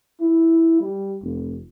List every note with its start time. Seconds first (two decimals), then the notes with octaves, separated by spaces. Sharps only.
0.20 E4
0.81 G3
1.23 F1